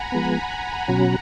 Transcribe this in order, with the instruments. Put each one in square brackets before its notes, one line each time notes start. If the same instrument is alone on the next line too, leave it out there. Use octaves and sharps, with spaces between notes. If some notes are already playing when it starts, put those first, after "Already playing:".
Already playing: [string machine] F#5 G#5 A#5 B5
[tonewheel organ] F3 G#3 B3
[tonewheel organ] B2 F#3 C#4 F#4 [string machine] F#5 A#5